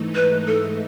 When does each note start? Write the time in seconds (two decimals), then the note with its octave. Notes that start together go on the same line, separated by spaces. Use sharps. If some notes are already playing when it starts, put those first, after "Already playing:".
Already playing: G#2 E3 A3 D#4
0.15 B4
0.47 A4